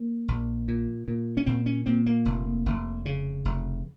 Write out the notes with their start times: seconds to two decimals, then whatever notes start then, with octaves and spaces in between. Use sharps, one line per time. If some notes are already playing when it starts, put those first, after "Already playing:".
Already playing: A#3
0.28 A#1
0.68 A#2
1.08 A#2
1.37 C#4
1.46 A#2 C4
1.66 C#4
1.86 A#2 C4
2.06 A#3
2.25 F1
2.66 F1
3.06 C#3
3.45 F1